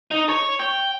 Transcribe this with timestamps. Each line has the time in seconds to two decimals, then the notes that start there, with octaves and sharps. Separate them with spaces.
0.11 D#4
0.29 C#5
0.59 G5